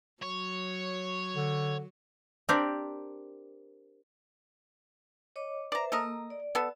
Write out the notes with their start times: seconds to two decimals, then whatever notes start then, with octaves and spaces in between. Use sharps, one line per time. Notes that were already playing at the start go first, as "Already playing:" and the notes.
0.23 F#3 C#5
1.36 D3
2.49 C4 D4 G4 A#4 D5
5.36 C#5 D#5 D6
5.72 B4 C5 D5 E5 A#5
5.92 A#3 A4 A#4 D#5
6.30 D5
6.55 B3 A4